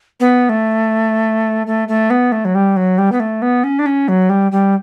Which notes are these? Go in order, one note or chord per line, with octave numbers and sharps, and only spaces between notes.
B3
A3
A3
A3
B3
A3
F#3
G3
F#3
G3
B3
A3
B3
C#4
D4
C#4
F#3
G3
G3